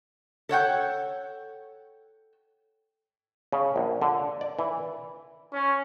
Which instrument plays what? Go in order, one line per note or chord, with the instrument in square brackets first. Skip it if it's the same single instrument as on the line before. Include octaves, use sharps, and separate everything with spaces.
[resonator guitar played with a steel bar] A4 C#5 F#5 G5
[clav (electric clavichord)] C#3
A#1
D3
D5
E3
[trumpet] C#4